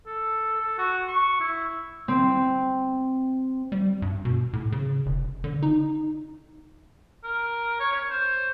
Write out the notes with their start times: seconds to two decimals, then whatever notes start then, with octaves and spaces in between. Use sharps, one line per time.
0.06 A4
0.60 A4
0.78 F#4
1.08 C#6
1.40 E4
2.08 C4
3.72 G3
4.02 G2
4.25 B2
4.53 A2
4.72 C#3
5.06 F1
5.44 D3
5.63 D#4
7.24 A#4
7.80 C#5
7.92 C#5
8.10 C5